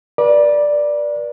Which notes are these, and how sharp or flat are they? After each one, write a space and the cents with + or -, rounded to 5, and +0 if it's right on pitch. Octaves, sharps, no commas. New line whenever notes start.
B4 -40 D5 +0